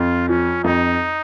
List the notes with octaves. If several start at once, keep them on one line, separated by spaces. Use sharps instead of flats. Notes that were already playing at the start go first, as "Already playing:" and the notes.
Already playing: F2 F4
F3 C#4
F2 D#4